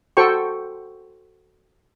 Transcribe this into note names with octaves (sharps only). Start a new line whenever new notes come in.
F#4 A4 C5 G5 C#6